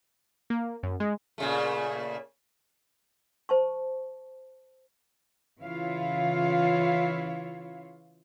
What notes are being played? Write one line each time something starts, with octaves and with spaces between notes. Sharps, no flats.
A#3
F#2
G#3
A#2 C#3 A3
C5 A5 C#6
C#3 E3 E4 F4 C#5 F5